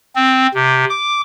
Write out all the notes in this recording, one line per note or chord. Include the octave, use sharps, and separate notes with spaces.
C4
C3
D6